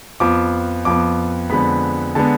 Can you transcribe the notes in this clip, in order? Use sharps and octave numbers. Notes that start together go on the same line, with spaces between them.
F2 F3 B3 D6
F2 F3 B3 D6
F2 D3 G#3 B3 B5
D3 G#3 B3 A5